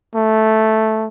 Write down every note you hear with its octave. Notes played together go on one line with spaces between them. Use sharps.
A3